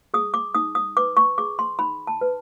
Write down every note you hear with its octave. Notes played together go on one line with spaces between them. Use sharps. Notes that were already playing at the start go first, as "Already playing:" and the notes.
G#4 D#6
D6
D#4 D#6
D#6
B4 D6
C#6
G#4 D6
C6
D#4 B5
A5
B4